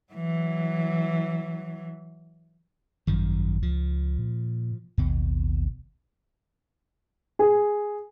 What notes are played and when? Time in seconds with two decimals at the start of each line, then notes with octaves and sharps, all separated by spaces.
0.13 E3 F#3
3.07 G#1 F#2 D#3 F3
3.62 C#2 F3
4.19 A#2
4.98 A1 D#2 B2
7.39 G#4